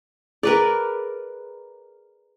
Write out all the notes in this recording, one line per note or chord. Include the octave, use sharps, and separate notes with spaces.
G#4 A#4 B4 D5